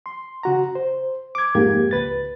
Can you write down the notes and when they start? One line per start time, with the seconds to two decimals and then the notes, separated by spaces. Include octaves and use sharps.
0.06 C6
0.43 C#3 F#4 A#5
0.75 C5
1.35 D6 G#6
1.55 F2 G#2 A#3 G4 G#6
1.91 C#2 B4 A6